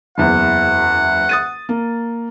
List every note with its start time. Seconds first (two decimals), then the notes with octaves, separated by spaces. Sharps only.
0.18 F#1 E2 F#5
1.29 D#6 A6 D#7
1.69 A#3